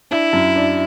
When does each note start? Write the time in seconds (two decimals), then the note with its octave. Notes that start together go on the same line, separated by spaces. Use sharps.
0.11 D4 E4
0.33 F#2
0.56 D4